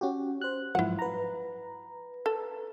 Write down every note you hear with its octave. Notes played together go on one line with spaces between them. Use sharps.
C#4 F#4 G4
C5 F#6
G#2 F3 F#3 E4 F#5
B4 A#5
A4